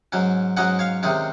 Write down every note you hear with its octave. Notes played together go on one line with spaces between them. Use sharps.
G#2 F#3 C#4
G#2 F#3 C#4 D#5 F#5
C#5 F5
C3 D#3 G#3 C#4